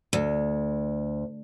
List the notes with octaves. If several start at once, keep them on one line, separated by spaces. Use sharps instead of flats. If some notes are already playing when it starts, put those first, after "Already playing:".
D2